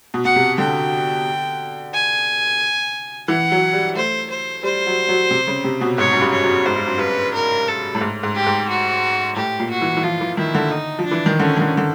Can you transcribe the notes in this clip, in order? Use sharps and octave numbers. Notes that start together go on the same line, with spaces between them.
B2
B2 F#5
C3
D3 G5
G#5
E3 F#5
F#3
G3
A3 C5
C5
G3 C5
F#3
F#3
C3
C#3
C3
B2
G#2 C#5
F#2
G2
C#5
F#2
G#2 C5
G2
F#2
G2 B4
A#4
A4
A2
G#2
G#2
G4
G#2
F#4
A2 G4
A#2
F#4
E3
E3
F3 F4
E3
D#3 E4
D3
D#4
F3
D4
E3
D#3
D3 C#4
D#3
D3
D3